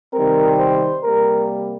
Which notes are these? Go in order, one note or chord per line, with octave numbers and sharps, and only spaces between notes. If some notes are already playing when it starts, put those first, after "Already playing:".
C3 D#3 G3 C4 A#4
C5
C3 G3 A#3 A#4